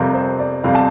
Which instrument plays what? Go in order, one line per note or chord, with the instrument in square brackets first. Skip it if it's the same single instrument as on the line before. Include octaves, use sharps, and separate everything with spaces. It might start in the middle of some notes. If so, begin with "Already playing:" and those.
Already playing: [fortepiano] F2 C3 G3 [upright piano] A#4
[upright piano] C5
D5
[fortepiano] F2 C3 G3 [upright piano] F5
[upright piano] A5